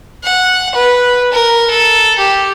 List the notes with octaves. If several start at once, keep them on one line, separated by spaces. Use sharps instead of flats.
F#5
B4
A#4
A4
G4